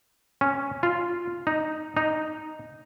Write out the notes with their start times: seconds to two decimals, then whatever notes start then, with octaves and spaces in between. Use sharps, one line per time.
0.41 C#4
0.83 F4
1.47 D#4
1.97 D#4